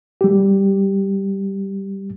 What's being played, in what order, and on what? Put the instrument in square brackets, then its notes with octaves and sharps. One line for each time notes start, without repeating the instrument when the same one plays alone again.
[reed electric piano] G3 G4